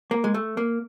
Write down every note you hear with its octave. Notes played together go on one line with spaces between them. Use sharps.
A#3
G#3
A3
A#3